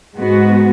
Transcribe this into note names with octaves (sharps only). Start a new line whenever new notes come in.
G#2 G#3 B3 F#4